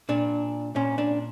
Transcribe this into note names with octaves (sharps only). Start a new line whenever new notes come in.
A#2 D4
A#2 C#4
D4